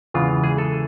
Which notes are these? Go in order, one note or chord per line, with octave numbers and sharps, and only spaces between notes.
E2 C#3 E3 G#3 F4
G#4
A4